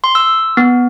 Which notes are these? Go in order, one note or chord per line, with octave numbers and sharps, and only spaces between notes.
C6
E6
B3